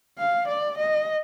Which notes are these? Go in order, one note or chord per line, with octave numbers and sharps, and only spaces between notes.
F5
D5
D#5